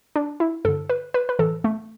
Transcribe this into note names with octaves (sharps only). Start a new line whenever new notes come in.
D4
E4
G2 D3 A4
B4
B4
B4
A2 E3 A4
A3